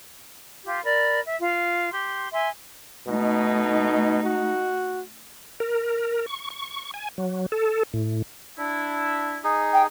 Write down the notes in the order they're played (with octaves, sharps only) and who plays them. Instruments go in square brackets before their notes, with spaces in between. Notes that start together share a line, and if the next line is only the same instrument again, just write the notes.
[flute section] F4 G4
A#4 D5 B5
E5
F4
G4 C6
E5 G#5 C6
[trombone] B2 [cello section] A3 D#4
[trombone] F#4
[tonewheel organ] A#4
C#6
C#6
G#5
F#3
A4
A2
[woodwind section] D4 E4
[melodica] D#4 G#4
[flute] G5